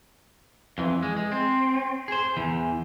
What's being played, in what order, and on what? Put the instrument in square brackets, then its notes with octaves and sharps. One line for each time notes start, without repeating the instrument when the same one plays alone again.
[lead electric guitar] F2 E3
G#3
G#3
C4
G#4 C5
E2 E3